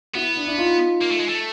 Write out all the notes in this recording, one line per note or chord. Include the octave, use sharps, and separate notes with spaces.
B3 E4 F#4
D4 E4
D4 E4
D#4 F4
A#3
A3
G#3
A3